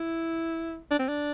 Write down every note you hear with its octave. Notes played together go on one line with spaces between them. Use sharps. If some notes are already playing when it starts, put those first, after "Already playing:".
Already playing: E4
D4
C4
D4